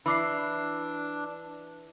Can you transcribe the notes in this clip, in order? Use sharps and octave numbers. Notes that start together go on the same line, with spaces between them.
E3 D4 B5 D6 C7